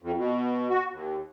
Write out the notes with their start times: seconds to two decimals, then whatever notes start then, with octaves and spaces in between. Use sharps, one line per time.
0.02 F2
0.17 B2
0.70 F#4
0.92 D#2